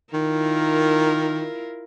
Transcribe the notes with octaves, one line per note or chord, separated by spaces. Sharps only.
D#3 E4 F4 A#4